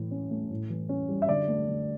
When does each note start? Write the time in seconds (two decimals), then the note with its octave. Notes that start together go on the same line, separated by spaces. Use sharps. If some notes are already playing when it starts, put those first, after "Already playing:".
Already playing: A2 E3
0.11 C#4
0.31 A3
0.51 A2
0.70 E3
0.89 C#4
1.09 G3
1.22 E5
1.29 D3 D5
1.48 A3
1.68 D3